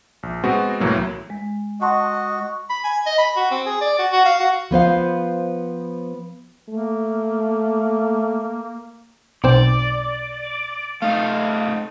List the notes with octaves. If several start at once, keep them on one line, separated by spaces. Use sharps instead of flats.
A#1
G#3 B3 C4 F#4
C2 A2 E3 F#3 A#3
G#3
F#4 D#5 F#5 A5 C6
B5
G#5
D#5
B5
F#4
C4
G#4
D5
F#4
F#4
F5
F#4
F3 B3 C5 F5
A3 A#3
B1 C4 C5 D5
A3 D#4 F5